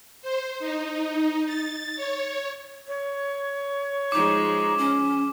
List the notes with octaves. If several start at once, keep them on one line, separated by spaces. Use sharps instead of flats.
C5
D#4
A6
C#5
C#5
F3 G#3 D#4 D6
C#4